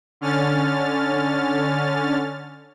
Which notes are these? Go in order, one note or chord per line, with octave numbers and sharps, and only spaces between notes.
D3 C#4 F6 A6